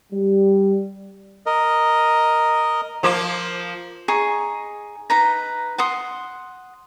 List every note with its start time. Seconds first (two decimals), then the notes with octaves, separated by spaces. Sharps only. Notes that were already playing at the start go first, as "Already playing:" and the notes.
0.11 G3
1.46 A#4 D#5
3.03 F3 A#3 F4
4.08 D#4 G#4 C#6
5.10 D#4 B4 A#5
5.78 F#5 C6 D#6